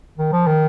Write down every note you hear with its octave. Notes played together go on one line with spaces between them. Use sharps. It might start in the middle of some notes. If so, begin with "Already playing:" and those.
D#3
F3
D#3